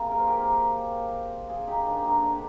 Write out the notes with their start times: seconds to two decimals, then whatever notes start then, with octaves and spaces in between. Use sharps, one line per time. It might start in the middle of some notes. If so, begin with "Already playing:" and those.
Already playing: C3 F3 A#3 F4 G#4
0.11 A#4
0.19 C5
0.27 G4 A#4
1.49 F4 G#4
1.67 D#4 G4
1.86 D4 F4
2.04 D3 G3 A#3 D#4 G4
2.23 D4